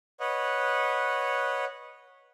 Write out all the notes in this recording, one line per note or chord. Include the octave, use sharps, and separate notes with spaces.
B4 C#5 D#5 F#5